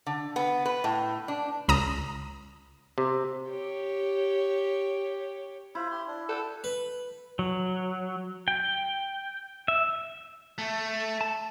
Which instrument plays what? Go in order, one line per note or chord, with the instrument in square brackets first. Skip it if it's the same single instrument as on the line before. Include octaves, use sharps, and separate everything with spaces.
[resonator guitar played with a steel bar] D3
B3
B4
A2
D4
[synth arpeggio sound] C#2 A#5 D#6
[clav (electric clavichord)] C3
[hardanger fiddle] G4 C#5
[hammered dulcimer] E4 [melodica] F4 C5 B5
[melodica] G4 C6
D4
[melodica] D4 F#5 G5 [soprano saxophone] A4
[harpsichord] B4
[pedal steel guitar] F#3
G5
E5
[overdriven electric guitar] A3
[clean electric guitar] A5